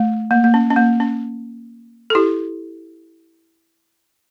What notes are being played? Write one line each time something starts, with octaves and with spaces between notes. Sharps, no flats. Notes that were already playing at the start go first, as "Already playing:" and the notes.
Already playing: A3
A#3
A#3
C#4
C#4
A#3
C#4
A4
E4 G4